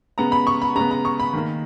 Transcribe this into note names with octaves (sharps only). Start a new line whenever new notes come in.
C#3 G#3 B3 A#5
B5
C#6
B5
C#3 G#3 B3 A#5
A#5
C#6
B5
D#3 A#3